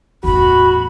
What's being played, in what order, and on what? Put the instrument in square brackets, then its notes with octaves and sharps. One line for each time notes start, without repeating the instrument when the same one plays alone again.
[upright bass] E2 A2 [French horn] F#4 [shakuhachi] B5